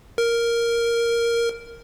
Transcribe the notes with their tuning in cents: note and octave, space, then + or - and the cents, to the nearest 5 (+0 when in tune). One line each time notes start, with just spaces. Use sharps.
A#4 +0